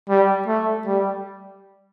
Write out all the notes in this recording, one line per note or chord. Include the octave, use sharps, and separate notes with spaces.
G3
A3
G3